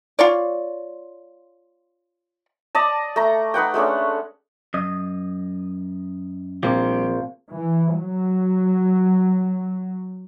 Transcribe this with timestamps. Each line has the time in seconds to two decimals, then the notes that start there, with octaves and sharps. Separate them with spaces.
0.19 F4 C#5 D5
2.75 D5 D#5 A5
3.16 A3 A#5
3.54 D#4 B4 F#5 G5
3.74 G#3 A3 C#4 D4
4.74 F#2 D#5
6.63 A#1 G2 F3 C4 G4 C5 F5
7.51 E3
7.98 F#3